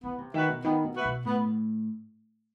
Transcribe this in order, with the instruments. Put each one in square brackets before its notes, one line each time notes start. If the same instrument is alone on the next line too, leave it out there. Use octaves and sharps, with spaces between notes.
[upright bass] E3 [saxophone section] B3
[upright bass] C3
[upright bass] D#3 [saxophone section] F#4 B4 E5
[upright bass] B2
[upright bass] D#3 [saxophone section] B3
[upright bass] B2
[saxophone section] F#4 B4 E5
[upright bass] B2
[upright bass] A2 [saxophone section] B3